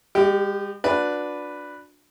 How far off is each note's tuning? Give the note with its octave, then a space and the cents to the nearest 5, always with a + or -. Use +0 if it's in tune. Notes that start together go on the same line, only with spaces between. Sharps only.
G#3 -45 G4 -10
D4 +0 F#4 -40 B4 +0